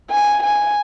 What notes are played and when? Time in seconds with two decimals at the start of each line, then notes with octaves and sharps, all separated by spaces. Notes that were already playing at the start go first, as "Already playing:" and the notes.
0.11 G#5
0.43 G#5